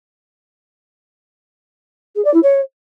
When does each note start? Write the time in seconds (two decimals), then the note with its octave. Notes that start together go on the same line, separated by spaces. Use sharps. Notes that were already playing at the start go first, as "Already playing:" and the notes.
2.15 G#4
2.25 D5
2.34 E4
2.43 C#5